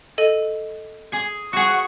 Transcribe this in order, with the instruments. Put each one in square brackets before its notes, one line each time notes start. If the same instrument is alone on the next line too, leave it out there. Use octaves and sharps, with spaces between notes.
[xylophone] A4 D#5 D#7
[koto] G#4 G#5
[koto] F#4 G#4 [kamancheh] F#5 C#6